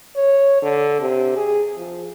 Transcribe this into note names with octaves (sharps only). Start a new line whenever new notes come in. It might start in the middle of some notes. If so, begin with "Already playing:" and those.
C#5
D3
C3
G#4
F3